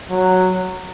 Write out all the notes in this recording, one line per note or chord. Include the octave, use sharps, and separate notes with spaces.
F#3